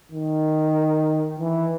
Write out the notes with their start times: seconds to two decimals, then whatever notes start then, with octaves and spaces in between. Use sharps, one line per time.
0.12 D#3
1.40 E3